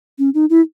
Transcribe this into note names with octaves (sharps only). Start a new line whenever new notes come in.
C#4
D#4
E4